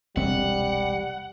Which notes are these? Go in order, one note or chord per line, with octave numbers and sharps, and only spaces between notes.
E1 C2 G3 C4 F#5